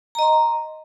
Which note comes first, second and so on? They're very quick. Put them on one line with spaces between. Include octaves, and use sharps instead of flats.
A#5 D#5 C6